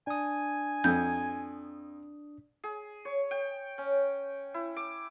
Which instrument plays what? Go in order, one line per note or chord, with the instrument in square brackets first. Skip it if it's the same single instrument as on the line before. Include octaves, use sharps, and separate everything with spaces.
[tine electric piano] D4 D#6 [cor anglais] G#5
[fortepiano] F2 [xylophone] G6
[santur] G#4
C#5
G5
C#4
E4
D6